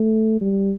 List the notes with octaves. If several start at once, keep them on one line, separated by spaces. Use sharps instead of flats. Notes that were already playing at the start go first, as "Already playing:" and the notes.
Already playing: A3
G3